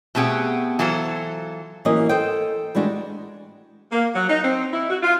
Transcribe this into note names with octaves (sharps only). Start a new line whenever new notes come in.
B2 A3 C4 G4 G#4 F#5
E3 F#3 F4 A4 C5
E3 F#3 A#3 C#4 G4 D#5
A4 C5 D#5 G5
E3 G3 G#3 D4 F#4
A#3
F#3
D#4
C4
E4
F#4
F4